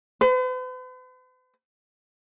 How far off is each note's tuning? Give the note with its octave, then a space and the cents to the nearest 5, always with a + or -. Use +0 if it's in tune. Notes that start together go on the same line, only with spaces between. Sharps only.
B4 +45